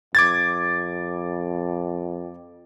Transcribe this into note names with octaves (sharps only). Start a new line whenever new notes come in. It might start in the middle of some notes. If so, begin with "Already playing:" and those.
F2 D6 G#6 A6